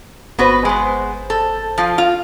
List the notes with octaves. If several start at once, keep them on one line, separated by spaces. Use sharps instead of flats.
G1 B3 F#4 B4 C5
G#3 B3
A4
F3 F4
F4